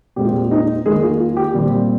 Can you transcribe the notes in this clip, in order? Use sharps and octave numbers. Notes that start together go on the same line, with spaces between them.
A#2 G#3 C4 G4
F4
G4
D#4 D#5
D#3 G#3 A#3 G#4
F4
F4
G4
A#2 G3 C4